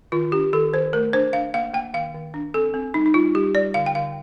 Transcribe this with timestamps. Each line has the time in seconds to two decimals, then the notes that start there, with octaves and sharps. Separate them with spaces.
0.12 D#3 F4
0.32 D4 G4
0.53 D#3 A4
0.73 D#3 C5
0.93 A3 A#4
1.13 D4 C5
1.33 D4 F5
1.54 A#3 F5
1.74 A#3 G5
1.94 D#3 F5
2.15 D#3
2.34 D4
2.54 C4 A4
2.74 C4
2.94 G3 D#4
3.06 D#4
3.14 G3 F4
3.35 G3 G4
3.54 G3 D5
3.74 D3 F5
3.86 G5
3.95 D3 F5